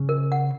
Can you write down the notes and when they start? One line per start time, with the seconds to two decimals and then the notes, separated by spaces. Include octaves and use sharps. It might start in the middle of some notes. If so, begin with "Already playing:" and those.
Already playing: C#3
0.09 A#4
0.32 F#5